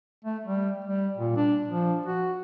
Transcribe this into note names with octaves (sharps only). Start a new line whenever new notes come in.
A3
G3
G3
A#2
D4
F3
F#4